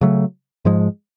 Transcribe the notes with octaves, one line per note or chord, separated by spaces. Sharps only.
C#3 F#3 A3
G#2 F3 G#3